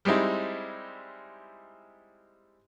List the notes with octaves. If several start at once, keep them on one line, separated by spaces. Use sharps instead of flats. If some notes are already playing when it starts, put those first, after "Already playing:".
G3 G#3 C4 D#4 E4